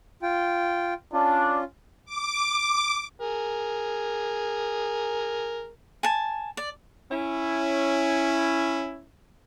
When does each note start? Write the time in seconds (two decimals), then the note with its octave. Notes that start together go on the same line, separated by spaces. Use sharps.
0.22 F4 G5
1.13 C#4 D4 F4
2.05 D6
3.20 G#4 A#4
6.03 G#5 A5
6.57 D5
7.11 C#4 E4